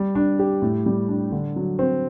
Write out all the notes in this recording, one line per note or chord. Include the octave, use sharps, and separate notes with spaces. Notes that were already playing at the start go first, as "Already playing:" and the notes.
Already playing: G3
D4
G4
A2
G3
D4
D3
F#3
C4